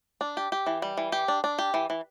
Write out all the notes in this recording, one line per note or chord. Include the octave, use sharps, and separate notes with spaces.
D4
G4
G4
E3
G3
E3
G4
D4
D4
G4
E3
E3